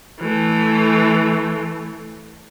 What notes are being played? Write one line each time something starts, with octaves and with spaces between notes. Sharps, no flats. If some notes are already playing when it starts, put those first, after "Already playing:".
E3 A3